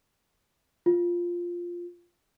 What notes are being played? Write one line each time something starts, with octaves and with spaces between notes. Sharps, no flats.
F4